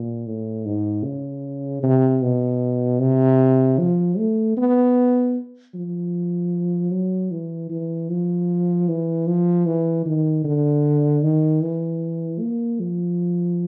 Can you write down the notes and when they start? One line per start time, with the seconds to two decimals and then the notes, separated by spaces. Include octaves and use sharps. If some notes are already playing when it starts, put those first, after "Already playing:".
Already playing: A#2
0.27 A2
0.65 G#2
1.04 C#3
1.83 C3
2.22 B2
3.00 C3
3.79 F3
4.18 A3
4.57 B3
5.75 F3
6.92 F#3
7.31 E3
7.70 E3
8.09 F3
8.89 E3
9.27 F3
9.66 E3
10.06 D#3
10.44 D3
11.23 D#3
11.62 E3
12.41 A#3
12.80 F3